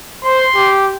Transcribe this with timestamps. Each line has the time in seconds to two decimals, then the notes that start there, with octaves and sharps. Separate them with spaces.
0.24 C5 C6
0.55 G4